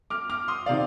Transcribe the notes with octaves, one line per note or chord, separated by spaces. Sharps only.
D6 F6
D6 F6
C6 D#6
C3 D#3 D5 F5